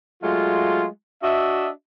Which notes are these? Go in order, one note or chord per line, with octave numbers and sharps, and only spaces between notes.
F#3 G#3 A3 F4
D4 F#4 D#5 E5